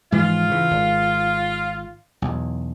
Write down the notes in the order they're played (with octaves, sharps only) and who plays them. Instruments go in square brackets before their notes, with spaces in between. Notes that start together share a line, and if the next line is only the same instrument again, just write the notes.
[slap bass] G#2 E3 F3 [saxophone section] F4
[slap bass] C#3 E3
G#1
B1 E2